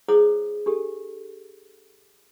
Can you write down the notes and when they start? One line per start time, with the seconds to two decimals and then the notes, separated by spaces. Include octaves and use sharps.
0.08 E4 G#4 C5 C#5 F#5 D#6
0.66 D4 G4 A4